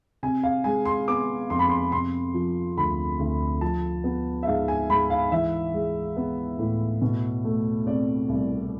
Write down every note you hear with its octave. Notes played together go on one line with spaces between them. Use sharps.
C3 G#5
F5
G#3 G#5
C6
B3 D6
F2 C6
B5
C6
C3 C6
F3
D2 B5
D2
F3 A5
B3
E5
G#2 F5
G#5
G#2 B5
F5
E3 E5
G#3
B3
A2
B2
A3
C4 D5
C2